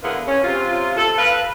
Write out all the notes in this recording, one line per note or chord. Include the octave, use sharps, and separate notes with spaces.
D3 E3 B3 F4 G#4 A#4
C#4
C3 F4
A4
A#4 B4 F5